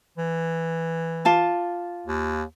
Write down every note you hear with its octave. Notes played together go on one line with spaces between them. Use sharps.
E3
F4 A5 D6
D#2